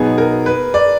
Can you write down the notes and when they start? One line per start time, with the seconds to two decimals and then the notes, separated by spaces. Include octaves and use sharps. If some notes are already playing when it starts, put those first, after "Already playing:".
Already playing: B2 F#3 B3 D#4 G#4
0.18 A#4
0.46 B4
0.74 D5